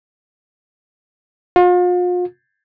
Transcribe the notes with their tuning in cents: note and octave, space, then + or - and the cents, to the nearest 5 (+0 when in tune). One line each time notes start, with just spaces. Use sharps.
F4 +40